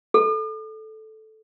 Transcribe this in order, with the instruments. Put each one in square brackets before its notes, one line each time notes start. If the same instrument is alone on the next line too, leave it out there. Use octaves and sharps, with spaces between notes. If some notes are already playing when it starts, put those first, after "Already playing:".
[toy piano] A4